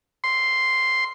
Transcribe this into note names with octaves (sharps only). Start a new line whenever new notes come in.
C6